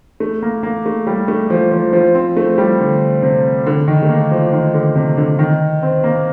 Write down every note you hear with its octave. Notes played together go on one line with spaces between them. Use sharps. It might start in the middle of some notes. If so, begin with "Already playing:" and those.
A3
A#3
A#3
A3
G3
A3
F3
F3
F3
C4
A3
G3
D3
C3
D3
D#3
A3
A#3
F3
D#3
D3
C3
D3
D#3
C4
A#3